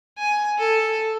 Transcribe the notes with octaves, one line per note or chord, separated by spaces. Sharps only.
G#5
A4